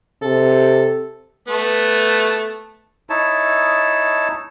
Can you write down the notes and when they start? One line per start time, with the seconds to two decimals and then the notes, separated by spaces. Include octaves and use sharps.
0.22 C3 A4
1.48 A3 B3
3.10 D#4 E4 C#5 A5